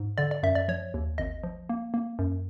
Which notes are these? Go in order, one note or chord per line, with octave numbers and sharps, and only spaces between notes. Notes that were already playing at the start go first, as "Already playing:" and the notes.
Already playing: G#2
D3 D5
D5
F#2 E5
D5
F3 C#5
D#2
G#1 D#5
F3
A#3
A#3
F#2